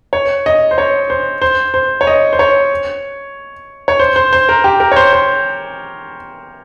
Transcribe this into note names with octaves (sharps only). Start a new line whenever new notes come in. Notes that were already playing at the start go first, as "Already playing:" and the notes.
C#5
D#5
C5
C#5
C5
C5
C5
C#5
D#5
C5
C#5
C#5
C5
C5
C5
A#4
G4
A#4
C#5
C5
C5